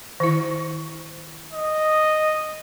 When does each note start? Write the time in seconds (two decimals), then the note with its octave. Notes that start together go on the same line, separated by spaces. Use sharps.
0.20 D#3 E4
1.53 D#5